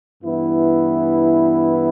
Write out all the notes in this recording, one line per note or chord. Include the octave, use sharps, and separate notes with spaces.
G2 E3 B3 E4